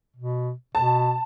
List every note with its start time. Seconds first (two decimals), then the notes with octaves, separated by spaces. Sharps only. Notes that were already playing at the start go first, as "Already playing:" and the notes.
0.16 B2
0.75 B2 A5